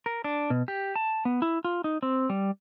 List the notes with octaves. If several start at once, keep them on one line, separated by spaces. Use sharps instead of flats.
A#4
D4
B2
G4
A5
B3
E4
F4
D#4
C4
G3